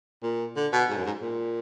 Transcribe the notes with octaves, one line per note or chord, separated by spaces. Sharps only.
A#2
D3
B2
G#2
F#2
G#2
A#2